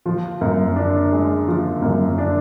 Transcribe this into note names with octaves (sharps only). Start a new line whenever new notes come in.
F3
F#2
D4
G#3
F3
F#2
D4